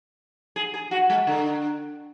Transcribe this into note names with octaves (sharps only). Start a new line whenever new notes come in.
G#4
G#4
F#4
G#3
D3